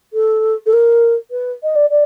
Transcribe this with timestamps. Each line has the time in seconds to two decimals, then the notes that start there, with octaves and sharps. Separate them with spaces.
0.13 A4
0.66 A4
0.73 A#4
1.31 B4
1.63 D#5
1.75 D5
1.90 D5